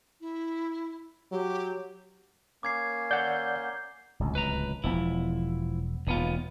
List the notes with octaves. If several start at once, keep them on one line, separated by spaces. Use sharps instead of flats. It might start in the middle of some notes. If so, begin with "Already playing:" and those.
E4
F#3 G4
A#3 C#4 D6 G#6 C7
D5 F#5 G6
D1 C#2
B4 A#5
E1 F3 B3 E4
E1 D#2 B3 F4